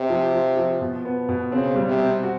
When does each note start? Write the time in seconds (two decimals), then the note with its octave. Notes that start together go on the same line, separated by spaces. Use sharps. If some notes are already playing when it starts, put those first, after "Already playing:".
Already playing: C3
0.10 F3
0.34 F3
0.57 F3
0.81 B2
1.05 B3
1.29 B2
1.52 C#3 C4
1.75 G3
1.88 C3
2.00 C4
2.23 F#4